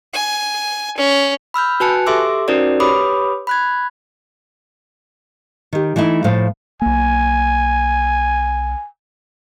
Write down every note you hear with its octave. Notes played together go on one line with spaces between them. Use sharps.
G#5
C#4
B5 E6 F6 G6
F#4 B4 G#5 A5 F#6 C#7
G4 A4 E5 C6 D6 E6
C#4 D#4 F#4 A#4 C5 D5
G4 B4 C#5 B5 D6 D#6
B5 F#6 G#6
D#3 G4
E3 A3 D#4 E4
A2 F3 C5 F5
B1 A#3 G#5